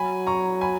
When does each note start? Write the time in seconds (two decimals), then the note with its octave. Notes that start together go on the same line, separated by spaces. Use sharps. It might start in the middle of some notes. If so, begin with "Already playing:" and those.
Already playing: F#3 G#5 B5
0.27 A#5 C#6
0.61 G#5 B5